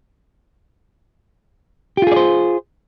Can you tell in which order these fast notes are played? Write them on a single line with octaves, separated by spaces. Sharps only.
G4 F4 G#4 D5 C5